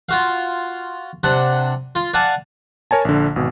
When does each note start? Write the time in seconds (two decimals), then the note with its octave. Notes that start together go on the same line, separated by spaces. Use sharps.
0.09 F4 F#4 F5
1.23 C3 D4 F#5
1.95 F4
2.14 D5 F5 F#5 G#5 A5
2.91 A#4 C#5 G#5 A5
3.05 A#1 D3
3.36 G#1 B2